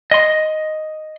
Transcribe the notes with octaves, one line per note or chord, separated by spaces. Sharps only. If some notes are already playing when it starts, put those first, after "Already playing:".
D#5 C6